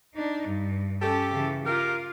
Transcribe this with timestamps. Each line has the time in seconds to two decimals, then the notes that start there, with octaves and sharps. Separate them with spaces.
0.14 D4 D#4
0.48 G2
1.01 C#4 G4 A4
1.32 C#3 E3
1.65 F4 G4 A#4